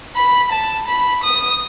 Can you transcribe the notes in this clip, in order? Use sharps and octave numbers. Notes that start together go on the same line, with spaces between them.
B5
A5
B5
D#6